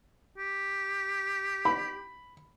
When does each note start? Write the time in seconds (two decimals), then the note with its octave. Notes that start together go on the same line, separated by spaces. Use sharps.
0.37 G4
1.65 B5